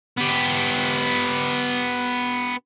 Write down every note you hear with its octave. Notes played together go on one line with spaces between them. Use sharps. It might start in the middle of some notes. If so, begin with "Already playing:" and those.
B3 G4